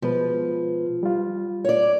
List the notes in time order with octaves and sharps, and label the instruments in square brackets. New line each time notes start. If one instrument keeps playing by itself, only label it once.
[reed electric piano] B2 G#3 B4 [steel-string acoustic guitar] F3
[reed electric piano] G3 F4
[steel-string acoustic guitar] C#5 D5